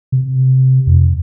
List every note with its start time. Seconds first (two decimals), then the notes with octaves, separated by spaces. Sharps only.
0.12 C3
0.87 F2